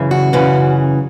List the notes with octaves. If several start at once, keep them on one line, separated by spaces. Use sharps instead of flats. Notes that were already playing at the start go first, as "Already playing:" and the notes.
Already playing: F#2 C#3 E3
F#4
F#2 C#3 E3